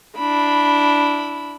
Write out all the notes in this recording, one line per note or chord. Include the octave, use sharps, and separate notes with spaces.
D4 E4 B5